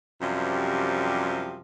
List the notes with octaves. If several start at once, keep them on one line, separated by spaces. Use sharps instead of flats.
F#2 C3 F3 G3